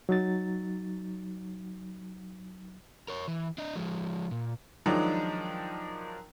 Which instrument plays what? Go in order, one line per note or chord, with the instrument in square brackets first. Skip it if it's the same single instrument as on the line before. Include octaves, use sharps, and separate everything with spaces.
[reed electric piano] F#3 D#4 A6
[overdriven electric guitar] A#4 C#5
E3
D4 D#5
F3 G#3
A#2
[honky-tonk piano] D#3 F3 F#3 G#3 D4 D#4